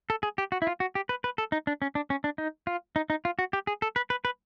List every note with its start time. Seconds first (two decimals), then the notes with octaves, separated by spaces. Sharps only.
0.10 A4
0.23 G#4
0.38 G4
0.52 F#4
0.62 E4
0.67 F4
0.80 F#4
0.95 G4
1.09 B4
1.24 B4
1.38 A4
1.52 D#4
1.67 D4
1.82 C#4
1.95 D4
2.10 C#4
2.24 D4
2.38 D#4
2.67 F4
2.96 D#4
3.10 D#4
3.25 F4
3.39 F#4
3.53 G4
3.67 G#4
3.82 A4
3.96 B4
4.10 B4
4.25 B4